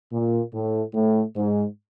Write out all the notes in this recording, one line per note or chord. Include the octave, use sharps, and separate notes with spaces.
A#2
A2
A2
G#2